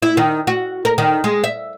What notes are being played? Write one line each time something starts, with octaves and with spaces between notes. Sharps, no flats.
E4
D#3
F#4
A#4
D#3
G#3
E5